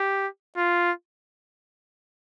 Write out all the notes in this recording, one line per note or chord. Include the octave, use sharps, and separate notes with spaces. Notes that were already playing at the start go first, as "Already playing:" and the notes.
Already playing: G4
F4